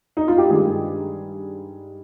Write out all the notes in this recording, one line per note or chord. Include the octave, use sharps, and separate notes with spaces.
D#4
F4
G4
G2 D#3 G#3 G#4